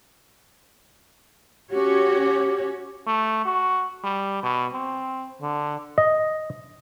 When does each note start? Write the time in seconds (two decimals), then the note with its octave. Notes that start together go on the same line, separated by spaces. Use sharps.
1.70 C#4 F#4 G4 C#5
3.07 A3
3.45 F#4
4.04 G3
4.43 B2
4.74 C4
5.42 D3
5.98 D#5